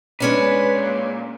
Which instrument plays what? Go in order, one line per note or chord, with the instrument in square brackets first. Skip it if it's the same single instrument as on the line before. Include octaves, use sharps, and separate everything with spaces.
[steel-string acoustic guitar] G#3 C#4 D4 [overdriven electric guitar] B4
[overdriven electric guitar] A#2